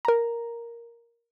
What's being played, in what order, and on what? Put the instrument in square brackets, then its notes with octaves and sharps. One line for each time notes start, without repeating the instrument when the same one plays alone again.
[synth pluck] A#4 A#5